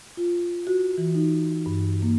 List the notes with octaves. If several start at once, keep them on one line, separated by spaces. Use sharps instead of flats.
F4
F#4
E3
D#4
G2
A#3